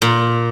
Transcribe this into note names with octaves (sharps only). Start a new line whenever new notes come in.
A#2